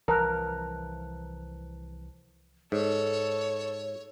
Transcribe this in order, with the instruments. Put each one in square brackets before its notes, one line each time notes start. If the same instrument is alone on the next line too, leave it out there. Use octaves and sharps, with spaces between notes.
[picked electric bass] C2 E3 F3 [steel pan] A#4 [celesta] A5 F#6
[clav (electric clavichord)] G#2 [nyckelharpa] A4 [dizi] C#5